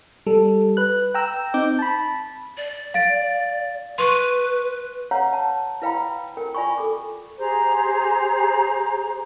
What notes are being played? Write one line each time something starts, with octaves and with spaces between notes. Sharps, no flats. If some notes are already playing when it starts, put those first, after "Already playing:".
G3 A4
B4 F#6
G5 A#5 E6
C4 D#4 D6 G6
A5 B5
D5
F5 A6 D7
B4 C6 C#6 D#7
B4 C#5 F5 F#5 A#5
A5
E4 B4 F5 G5 A#5 B5
A#4 G5
F4 D5 G#5 B5 C#6
A4 D6
G4 G#4 C5 A#5